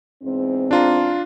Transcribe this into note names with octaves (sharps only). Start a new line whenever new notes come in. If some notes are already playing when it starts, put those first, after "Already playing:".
E2 G#2 C4
D4 F4 A#5